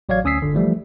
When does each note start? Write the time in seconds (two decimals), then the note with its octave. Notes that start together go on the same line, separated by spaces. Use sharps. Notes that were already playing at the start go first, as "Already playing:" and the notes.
0.09 A1 F#3 C#5 D5 F5 G#6
0.24 D2 C#4 D#6 E6 B6 C7
0.42 G1 D3
0.54 E3 F3 G3 A3